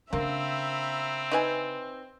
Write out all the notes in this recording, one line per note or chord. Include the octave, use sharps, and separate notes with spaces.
C#3 A#3 C4 D4 E5 A#5 B5
D#4 B4 G#5